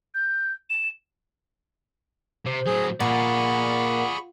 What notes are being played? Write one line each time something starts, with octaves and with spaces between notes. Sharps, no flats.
G6
E7
C3 C5
A2 F#3 G#4
A#2 G#4 D5 F#5 B5 C#6